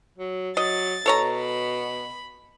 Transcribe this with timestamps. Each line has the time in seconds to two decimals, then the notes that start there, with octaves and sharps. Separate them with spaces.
0.18 F#3
0.57 F#3 D#5 A6
1.06 B2 A4 C#5 A#5
1.39 B5